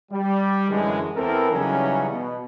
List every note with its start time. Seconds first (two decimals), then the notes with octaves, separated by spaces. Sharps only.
0.11 G3
0.69 F#2 D3 E3 G#3
1.15 E2 E3 C4 A4 A#4
1.52 C#3 E3 F#3 G3 C#4 D#4
2.09 B2